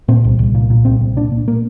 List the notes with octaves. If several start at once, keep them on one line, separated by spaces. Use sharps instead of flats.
A#2 C4
C2
C2
A#2
A#2
C2 C4
C2
A#2 D4
A#2
A#3